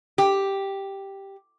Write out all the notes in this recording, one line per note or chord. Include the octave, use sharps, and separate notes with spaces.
G4